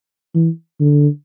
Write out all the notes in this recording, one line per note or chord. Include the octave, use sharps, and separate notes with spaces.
E3
D3